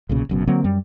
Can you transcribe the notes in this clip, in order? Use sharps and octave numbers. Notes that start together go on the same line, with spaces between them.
B1 A#2 C#3
F#1 F#2 B2
D3 F#3 A#3 C4
F#2 G3